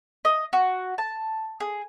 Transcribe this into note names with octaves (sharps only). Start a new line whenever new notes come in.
D#5
F#4
A5
G#4